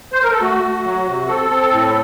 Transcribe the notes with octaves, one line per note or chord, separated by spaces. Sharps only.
C5
A#4
A4
A3 F#4
A3
F#3
C3
C4 A4
C4
A2